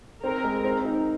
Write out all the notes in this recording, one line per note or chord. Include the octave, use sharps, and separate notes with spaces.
C4 A#4
G#3
C4
D#4